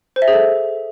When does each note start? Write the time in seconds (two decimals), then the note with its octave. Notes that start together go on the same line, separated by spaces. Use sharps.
0.16 C5
0.22 E5
0.28 G#4
0.33 A4